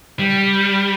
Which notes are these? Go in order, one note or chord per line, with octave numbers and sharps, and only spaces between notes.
G3